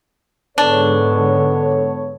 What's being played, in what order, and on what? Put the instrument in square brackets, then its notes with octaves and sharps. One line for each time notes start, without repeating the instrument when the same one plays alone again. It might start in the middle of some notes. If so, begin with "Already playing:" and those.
[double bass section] G#2 D3 G#3 [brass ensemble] B3 A4 C#5 [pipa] D4